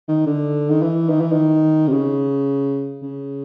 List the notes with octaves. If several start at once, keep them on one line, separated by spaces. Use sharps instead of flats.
D#3
D3
D#3
E3
D#3
E3
D#3
C3
C#3
C#3